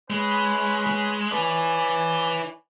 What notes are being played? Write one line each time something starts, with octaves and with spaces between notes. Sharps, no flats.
G#3 C#4 B4 B5
G#3
E4 B4 C#5 D5 G#5